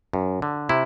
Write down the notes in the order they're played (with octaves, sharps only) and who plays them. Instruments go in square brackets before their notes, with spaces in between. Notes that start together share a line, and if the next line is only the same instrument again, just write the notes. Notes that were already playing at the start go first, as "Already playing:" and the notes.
[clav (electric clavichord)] F#2
D3
C3 E4